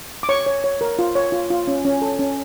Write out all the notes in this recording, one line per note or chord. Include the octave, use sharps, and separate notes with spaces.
D6
C#5 C#6
C#5
C#5
A#4
F4
C#5
F4
F4
C#4
C#4
A4
C#4